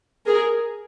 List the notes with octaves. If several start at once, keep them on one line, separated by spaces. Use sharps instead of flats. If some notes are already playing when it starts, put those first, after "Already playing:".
G#4 A#4